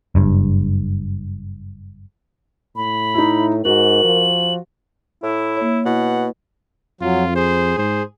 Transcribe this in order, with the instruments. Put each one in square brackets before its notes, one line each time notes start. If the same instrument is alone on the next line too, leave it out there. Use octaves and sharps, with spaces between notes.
[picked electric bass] F#1 G2
[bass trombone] A2 [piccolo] B5
[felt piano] D#4 E4
[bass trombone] G#2 [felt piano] F#4 [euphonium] A#4 [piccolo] F#7
[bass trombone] F3
[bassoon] A2 [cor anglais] E4
[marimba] A#3 C#5
[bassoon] B2 [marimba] E4 B4 [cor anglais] F#5
[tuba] F2 [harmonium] F#3 [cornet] F4
[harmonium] G#4 [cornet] C5
[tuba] G#2 [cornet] C5